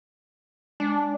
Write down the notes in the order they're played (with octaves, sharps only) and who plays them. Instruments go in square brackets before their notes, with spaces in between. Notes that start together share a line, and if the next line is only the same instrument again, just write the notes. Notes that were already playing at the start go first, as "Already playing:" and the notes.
[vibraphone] G#3 [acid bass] D4